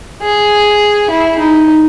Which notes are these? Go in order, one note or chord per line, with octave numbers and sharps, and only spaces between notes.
G#4
E4
D#4